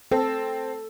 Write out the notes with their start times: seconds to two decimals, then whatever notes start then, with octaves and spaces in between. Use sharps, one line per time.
0.11 C4 A4